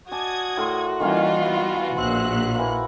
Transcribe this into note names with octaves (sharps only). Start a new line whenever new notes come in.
F#4 D5 G#5 A5 D#6 G#6
A2 A#4 C6
D#3 E3 G3 A#3 C#4 F4
B3
A#1 A#2 C5 E5 F#6
E3 A#3